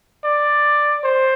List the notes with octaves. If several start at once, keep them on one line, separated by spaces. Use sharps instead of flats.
D5
C5